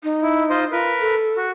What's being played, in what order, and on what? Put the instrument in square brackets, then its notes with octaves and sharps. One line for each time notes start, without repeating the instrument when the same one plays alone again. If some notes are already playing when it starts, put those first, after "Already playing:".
[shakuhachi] D#4
[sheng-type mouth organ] E4
F4 C5 D#5
[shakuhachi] F4 [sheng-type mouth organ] A#4 B4
[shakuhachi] A4
[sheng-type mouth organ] F#4